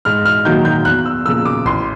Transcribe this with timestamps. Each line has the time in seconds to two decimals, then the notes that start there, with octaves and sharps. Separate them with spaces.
0.05 G#2 F6
0.25 F6
0.45 D#3 F#3 A#3 G6
0.65 G6
0.85 E2 F#6
1.06 E6
1.26 C#3 F3 A#3 E6
1.45 D6
1.65 A1 C6